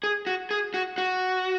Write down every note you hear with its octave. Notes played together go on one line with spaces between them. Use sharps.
G#4
F#4
G#4
F#4
F#4